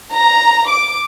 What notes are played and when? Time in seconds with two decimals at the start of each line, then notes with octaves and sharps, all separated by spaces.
0.11 A#5
0.68 D6